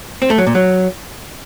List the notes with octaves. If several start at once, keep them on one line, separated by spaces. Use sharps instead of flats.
C4
A3
F#3
A#2
F#3